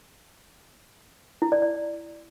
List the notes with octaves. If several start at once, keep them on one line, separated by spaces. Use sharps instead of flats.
E4
D5
D5